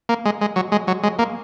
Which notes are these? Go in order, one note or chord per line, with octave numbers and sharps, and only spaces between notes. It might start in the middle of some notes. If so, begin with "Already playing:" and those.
A#3
G#3
G#3
F#3
G#3
F#3
G#3
A#3